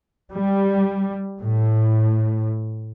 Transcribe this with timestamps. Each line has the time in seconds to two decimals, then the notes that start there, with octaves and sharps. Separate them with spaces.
0.33 G3
1.41 A2